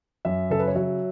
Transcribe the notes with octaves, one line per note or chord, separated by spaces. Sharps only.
F#2 E5
C#3 A4
B4
C#5
F#3 E5